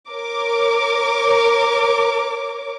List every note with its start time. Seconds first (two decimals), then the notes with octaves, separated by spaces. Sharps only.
0.10 A#4 C#5 D6